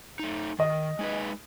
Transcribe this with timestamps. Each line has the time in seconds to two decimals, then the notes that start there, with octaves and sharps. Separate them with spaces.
0.19 A3 D#4
0.59 D#3 D#5
0.99 G#3 D#4 G#4 B4